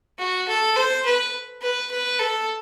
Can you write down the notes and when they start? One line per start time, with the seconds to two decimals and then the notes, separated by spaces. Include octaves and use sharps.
0.19 F#4
0.48 A4
0.76 C5
1.05 B4
1.62 B4
1.91 B4
2.19 A4